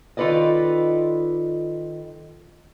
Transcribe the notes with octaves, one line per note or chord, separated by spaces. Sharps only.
D#3 F4 A4 B4 D5 D#5